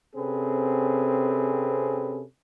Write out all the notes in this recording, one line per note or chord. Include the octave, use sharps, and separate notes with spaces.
C3 C4 C#4 G#4 A4 B4